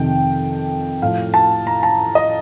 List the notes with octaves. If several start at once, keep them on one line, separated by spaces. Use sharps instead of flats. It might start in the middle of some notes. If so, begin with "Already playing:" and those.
Already playing: F2 C3 D#3 G5
A2 F3 F5
A5
A#5
A5
D#5